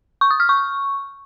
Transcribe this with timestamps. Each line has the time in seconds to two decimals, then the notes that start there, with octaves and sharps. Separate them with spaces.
0.21 C#6
0.31 D#6
0.40 F6
0.49 C#6